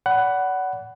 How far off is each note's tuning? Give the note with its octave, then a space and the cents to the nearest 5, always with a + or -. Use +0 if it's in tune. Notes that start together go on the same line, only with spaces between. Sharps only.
D5 -40 F#5 +15 B5 +0